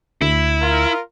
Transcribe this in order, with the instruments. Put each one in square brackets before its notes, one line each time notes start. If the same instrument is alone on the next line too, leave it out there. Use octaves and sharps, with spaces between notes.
[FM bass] D2 [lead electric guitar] E4
[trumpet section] F4 A#4